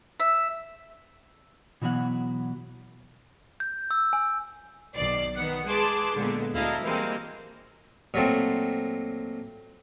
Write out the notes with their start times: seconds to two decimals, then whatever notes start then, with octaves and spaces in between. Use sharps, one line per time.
0.20 E5
1.82 B2 E3 F#3 B3 F#5
3.60 G6
3.91 E6
4.13 G#5
4.95 B1 D#3 D5 C7
5.34 D#3 B3 F#5
5.65 G#3 G#4 B4 A5 C6 D6
6.14 A#2 D3 G#3 B3
6.54 D2 E4 D#5 F5 A5 A#5
6.83 E3 G3 G#3 A#3 C4
8.14 A#2 F#3 A3 C4